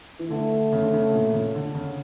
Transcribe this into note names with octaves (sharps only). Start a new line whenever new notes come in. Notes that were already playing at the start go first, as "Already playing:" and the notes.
E3
D3 A3
C#3
D3
C#3
A#2
C#3
D3
C#3